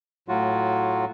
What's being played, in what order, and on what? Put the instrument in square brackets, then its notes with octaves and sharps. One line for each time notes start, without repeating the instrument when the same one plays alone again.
[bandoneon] A2 F#3 F4 F#4